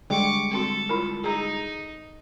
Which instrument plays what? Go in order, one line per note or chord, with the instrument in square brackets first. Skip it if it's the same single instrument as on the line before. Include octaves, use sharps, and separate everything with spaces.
[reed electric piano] D3 G3 G#3 [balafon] G5 [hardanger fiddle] C#6 D6
[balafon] C4 F#4 [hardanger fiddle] A4
[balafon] E4 F4 A#4
[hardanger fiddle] D#4 [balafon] G#4 A#5